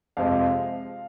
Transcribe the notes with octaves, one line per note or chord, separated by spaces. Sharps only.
F2 C3 F3 G#3 F5